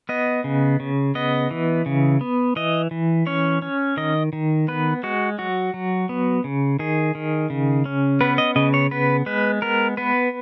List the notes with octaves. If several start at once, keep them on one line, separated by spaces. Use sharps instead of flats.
B3 D#5
C#3
C#3
B3 D#5
E3
C#3
B3
E3 D#5
E3
C#4 C#5
C#4
D#3 D#5
D#3
B3 B4
G#3 F#4
F#3 F#4
F#3
B3
C#3
D#3 G#4
D#3
C#3
C#4
B3 B4
D#5
C#3 D#5
C#5
B3 B4
G#3 B4
B3 A#4
B3 B4